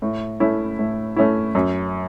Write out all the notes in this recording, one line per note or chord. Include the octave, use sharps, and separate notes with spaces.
A2
A3 C#4 E4
A2
A3 C#4 E4
F#2